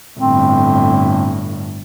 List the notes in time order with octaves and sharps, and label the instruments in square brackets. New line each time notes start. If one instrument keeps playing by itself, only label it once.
[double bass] G1 A2 [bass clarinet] C4